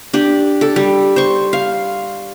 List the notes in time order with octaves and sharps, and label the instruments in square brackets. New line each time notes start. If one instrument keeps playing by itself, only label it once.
[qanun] D4 G4
A4
G3
C5 C#6
F5